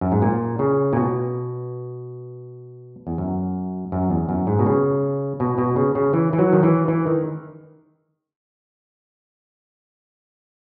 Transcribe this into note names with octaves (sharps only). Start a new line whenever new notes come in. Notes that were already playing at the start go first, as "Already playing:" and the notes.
F#2
G#2
A#2
C#3
A#2
B2
E2
F#2
F#2
E2
F#2
G#2
B2
C#3
B2
B2
C#3
C#3
E3
E3
F#3
D#3
E3
E3
D#3